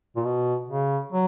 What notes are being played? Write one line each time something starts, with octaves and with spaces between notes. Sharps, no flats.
A#2
B2
C#3
F#3